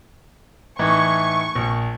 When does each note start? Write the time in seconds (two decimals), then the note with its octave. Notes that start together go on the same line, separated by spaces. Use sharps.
0.79 A2 E3 D#4 C#6
1.56 A#1